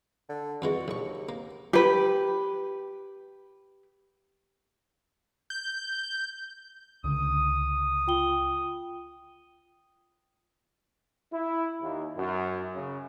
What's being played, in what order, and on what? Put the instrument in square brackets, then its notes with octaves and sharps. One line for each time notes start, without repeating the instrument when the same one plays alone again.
[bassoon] D3
[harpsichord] F2 E3 G#3 [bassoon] F#4
[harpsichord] A#1 C#6 [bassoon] D#2
[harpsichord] A#3
[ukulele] G4 B4
[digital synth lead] G6
[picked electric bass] C#2 D3 [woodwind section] D#6
[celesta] F4 G5 G7
[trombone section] E4
D#2
F#2
C#3